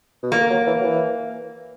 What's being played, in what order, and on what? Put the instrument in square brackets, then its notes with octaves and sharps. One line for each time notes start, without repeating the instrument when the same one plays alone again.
[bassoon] B2
[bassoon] A#2 [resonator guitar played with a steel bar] A#3
[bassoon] F#3
E3
F#3
E3